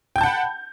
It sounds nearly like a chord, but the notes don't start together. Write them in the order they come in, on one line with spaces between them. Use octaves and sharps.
G5 G6 A5 F#5 B5